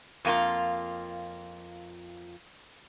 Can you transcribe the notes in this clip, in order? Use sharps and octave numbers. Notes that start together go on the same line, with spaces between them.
F2 A#3 F4